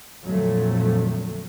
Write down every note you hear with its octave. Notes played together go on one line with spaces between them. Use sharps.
F2 A#2 D3 F3 F#3 A3